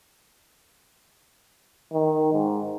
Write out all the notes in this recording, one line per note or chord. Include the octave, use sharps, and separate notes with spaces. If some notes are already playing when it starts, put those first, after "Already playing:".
D#3
G#2